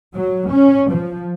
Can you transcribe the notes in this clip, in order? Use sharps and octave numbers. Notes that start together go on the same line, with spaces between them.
F#3
C#4
F3